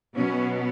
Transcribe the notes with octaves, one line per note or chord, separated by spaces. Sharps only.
B2 F#3 B3 C#4